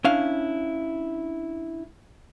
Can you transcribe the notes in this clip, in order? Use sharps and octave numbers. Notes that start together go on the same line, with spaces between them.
C#4 D4 E4 F5